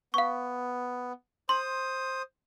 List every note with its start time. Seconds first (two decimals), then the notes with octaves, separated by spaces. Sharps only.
0.14 B3 F5 C#6
1.49 C5 C6 D#6